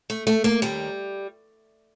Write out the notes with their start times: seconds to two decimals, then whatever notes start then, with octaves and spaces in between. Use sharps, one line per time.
0.10 A3
0.27 A3
0.44 A#3
0.62 D#2 D#3 G3